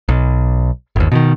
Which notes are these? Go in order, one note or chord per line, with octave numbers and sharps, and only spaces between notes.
B1
G1 D#2
B2 D3 D#3